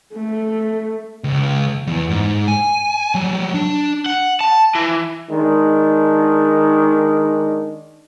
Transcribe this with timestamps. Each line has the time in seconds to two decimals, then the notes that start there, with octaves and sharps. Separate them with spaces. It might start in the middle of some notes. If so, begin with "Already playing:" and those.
0.14 A3
1.24 C#2
1.87 E2
2.10 G#2
2.48 G#5
3.15 F#3 G3
3.54 D4
4.06 F#5
4.41 A5
4.75 E3
5.29 D#3 G#3 D4